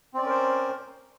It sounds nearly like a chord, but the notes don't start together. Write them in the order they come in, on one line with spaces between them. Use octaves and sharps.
C4 D5 C#4 A#4 C5